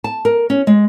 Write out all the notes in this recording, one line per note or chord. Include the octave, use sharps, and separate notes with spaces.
A5
A#4
C#4
G#3